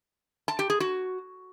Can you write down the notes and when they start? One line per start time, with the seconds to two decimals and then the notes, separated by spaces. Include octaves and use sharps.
0.48 A5
0.59 G4
0.70 G#4
0.80 F#4